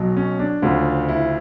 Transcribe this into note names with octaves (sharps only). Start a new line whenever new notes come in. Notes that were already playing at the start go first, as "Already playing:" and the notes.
Already playing: B1 B2 F#3
C#4
D4
D2 C#3 F3
E4